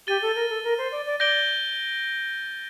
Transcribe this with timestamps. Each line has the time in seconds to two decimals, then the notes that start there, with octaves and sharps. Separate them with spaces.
0.07 G4 A6 D#7 G7
0.22 A4
0.36 A#4
0.50 A4
0.64 A#4
0.78 C5
0.92 D5
1.06 D5
1.20 D5 G6 A#6 D7 G7